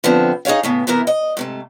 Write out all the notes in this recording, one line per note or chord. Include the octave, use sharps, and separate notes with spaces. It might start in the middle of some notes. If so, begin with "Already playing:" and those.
D3 F3 B3 C4
D#4 G#4 A#4 C#5 F5
A2 C#3 B3
C3 E3 B3 E4 A#4
D#5
G#2 C3 A3